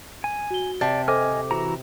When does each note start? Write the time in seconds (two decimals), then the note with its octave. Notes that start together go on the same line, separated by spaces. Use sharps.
0.24 G#5
0.50 F#4 G7
0.81 C3 D5 A5
1.08 A4 C5 D#5 G#5 D6 F6
1.51 E3 F#4 A#5